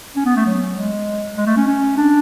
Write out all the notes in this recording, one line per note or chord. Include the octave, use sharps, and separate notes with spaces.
C#4
B3
A3
F#3
G#3
G#3
A3
C#4
C#4
D4